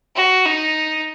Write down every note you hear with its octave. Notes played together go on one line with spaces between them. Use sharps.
F#4
D#4